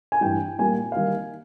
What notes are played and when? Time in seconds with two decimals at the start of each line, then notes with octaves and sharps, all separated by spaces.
0.12 G#5
0.21 G2 E3 G3 G5
0.59 A#2 G3 A#3 G#5
0.92 D#3 G3 A#3 F5